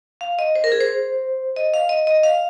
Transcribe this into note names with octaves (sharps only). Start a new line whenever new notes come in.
F5
D#5
C5
A#4
G#4
C5
D#5
F5
D#5
D#5
F5